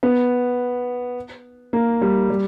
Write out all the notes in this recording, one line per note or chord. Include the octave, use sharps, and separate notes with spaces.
B3
A#3
G3
G3